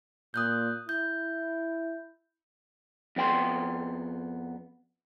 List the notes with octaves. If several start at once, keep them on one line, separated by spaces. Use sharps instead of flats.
A#2 D#6 F#6 G6
E4 G6
F2 B3 G5 C6